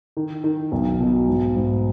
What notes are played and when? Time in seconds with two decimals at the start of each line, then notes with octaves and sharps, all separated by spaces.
0.17 D#3
0.44 D#3
0.72 B1
1.00 B2
1.28 G#2
1.56 G#2